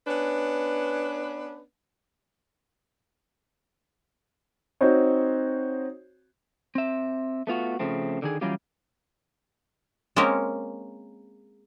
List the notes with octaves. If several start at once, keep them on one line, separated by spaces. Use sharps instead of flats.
B3 C#4 D4 B4
C4 D#4 F#4 C5 C#5
C4 E5
A3 B3 F4 F#4
C#3 F3 A3 C4
D3 D#3 G#4
E3 F#3 G3 C#4 F4 G4
G#3 A#3 C4 C#4 A#4 C#5